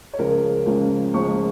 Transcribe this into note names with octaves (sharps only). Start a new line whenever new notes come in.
C#5
C#2 C#3 F3 G#3 C#4 A#4
C#2 C#3 F3 G#3 C#4
C#2 C#3 F3 G#3 C#4 C#6